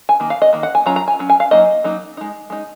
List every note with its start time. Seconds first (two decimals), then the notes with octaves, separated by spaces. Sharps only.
0.09 G#5
0.20 D#3 A#3
0.30 F5
0.42 D#5
0.53 D#3 A#3
0.63 F#5
0.75 G#5
0.86 F#3 C#4 F4 A#5
0.96 A#5
1.08 G#5
1.19 F#3 C#4
1.30 G#5
1.40 F5
1.51 F#3 A#3 D#4 D#5
1.84 F#3 A#3 D#4
2.17 G#3 D#4
2.50 G#3 D#4